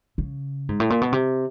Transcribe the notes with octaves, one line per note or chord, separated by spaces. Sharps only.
C#3
G#2
A2
A#2
B2
C3